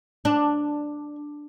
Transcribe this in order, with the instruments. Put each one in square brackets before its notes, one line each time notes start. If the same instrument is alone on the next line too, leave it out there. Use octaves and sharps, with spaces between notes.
[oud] D4